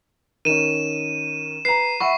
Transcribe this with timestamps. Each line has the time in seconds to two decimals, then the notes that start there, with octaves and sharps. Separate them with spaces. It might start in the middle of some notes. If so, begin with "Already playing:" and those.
0.45 D#3 C#4 D#7 E7
1.65 B4 A#5 C7
2.00 E5 F#5 B5 C#6